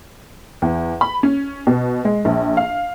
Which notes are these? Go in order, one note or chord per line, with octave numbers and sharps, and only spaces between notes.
E2
B5
C#4
B2
G#3
A#1
F5